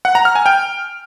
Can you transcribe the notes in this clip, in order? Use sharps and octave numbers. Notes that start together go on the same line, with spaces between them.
F#5
A#5
F6
G#5
G5